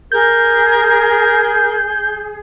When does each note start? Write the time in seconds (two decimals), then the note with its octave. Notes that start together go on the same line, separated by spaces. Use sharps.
0.12 G#4 A#4 G6